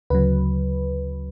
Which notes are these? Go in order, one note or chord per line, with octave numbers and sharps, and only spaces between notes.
D2 C#3 F#3 B4